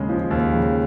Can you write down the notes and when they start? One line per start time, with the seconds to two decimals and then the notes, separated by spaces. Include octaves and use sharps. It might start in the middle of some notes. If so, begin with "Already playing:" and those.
Already playing: D#2 C#3 G#3
0.09 F3
0.31 D#2
0.53 C#3